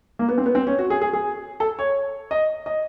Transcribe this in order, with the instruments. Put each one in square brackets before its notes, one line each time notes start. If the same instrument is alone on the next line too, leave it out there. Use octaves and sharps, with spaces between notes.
[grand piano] A#3
B3
C4
B3
C4
C#4
F#4
G#4
G#4
G#4
A4
C#5
D#5
D#5